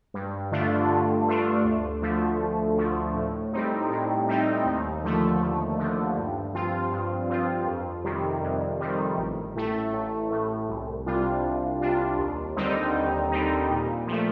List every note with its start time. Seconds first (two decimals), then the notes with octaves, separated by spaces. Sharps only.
0.14 G2
0.52 D3 A3 D4 F4
0.89 G2
1.27 D3 A3 D4 F4
1.64 D2
2.02 D3 F3 A3
2.40 D2
2.77 D3 F3 A3
3.15 A2
3.53 G3 C4 D#4
3.91 A2
4.28 G3 C4 D#4
4.66 D#2
5.04 D3 F3 A3
5.42 D#2
5.79 D3 F3 A3
6.16 G2
6.54 F3 C4 F4
6.92 G2
7.30 F3 C4 F4
7.66 F2
8.04 C3 D#3 G3
8.42 F2
8.80 C3 D#3 G3
9.18 A1
9.56 A2 A3
9.93 A1
10.31 A2 A3
10.69 C2
11.06 C3 G3 D4 F4
11.43 C2
11.81 C3 G3 D4 F4
12.18 D#2
12.56 D3 G3 C4 D#4
12.95 D#2
13.31 D3 G3 C4 D#4
13.70 A#2
14.07 F3 A3